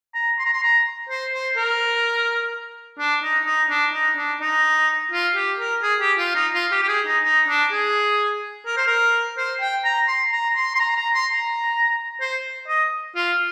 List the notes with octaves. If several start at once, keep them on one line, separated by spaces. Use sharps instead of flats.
A#5
C6
A#5
C6
A#5
C5
C5
A#4
D4
D#4
D#4
D4
D#4
D4
D#4
F4
G4
A#4
G#4
G4
F4
D#4
F4
G4
G4
G#4
D#4
D#4
D4
G#4
A#4
C5
A#4
C5
G5
A#5
C6
A#5
C6
C6
A#5
A#5
C6
A#5
C5
D#5
F4